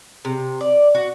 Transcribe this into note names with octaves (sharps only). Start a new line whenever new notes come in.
C3
D5
F#4